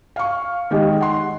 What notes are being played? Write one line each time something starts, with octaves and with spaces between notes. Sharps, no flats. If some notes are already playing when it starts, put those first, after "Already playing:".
F5 C#6
D#3 G#3 G4 D#5
F#5 C6